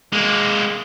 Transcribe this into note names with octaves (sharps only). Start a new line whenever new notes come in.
G#3 A#3